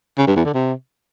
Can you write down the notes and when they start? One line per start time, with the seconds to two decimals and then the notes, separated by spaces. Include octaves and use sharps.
0.18 C#3
0.27 G2
0.36 E2
0.45 D3
0.54 C3